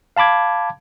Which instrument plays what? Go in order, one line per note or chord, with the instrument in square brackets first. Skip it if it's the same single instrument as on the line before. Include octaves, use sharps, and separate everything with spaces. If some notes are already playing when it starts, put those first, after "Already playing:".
[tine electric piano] F5 A5 B5 D6 G#6